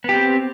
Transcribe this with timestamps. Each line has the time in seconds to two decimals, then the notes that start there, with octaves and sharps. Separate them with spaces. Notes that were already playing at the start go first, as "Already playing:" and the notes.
0.04 B3
0.09 G4
0.13 C4